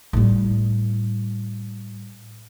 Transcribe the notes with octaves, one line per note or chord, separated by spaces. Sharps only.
A2 G3